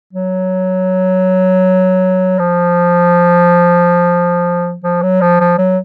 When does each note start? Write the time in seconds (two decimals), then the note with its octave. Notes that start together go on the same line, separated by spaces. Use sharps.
0.13 F#3
2.39 F3
4.83 F3
5.02 F#3
5.21 F3
5.40 F3
5.58 F#3